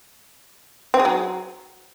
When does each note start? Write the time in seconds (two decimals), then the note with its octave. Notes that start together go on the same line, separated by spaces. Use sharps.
0.94 C4
0.99 G#4
1.05 F#3